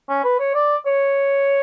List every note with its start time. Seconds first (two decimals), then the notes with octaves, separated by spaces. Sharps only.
0.09 C#4
0.24 B4
0.40 C#5
0.55 D5
0.86 C#5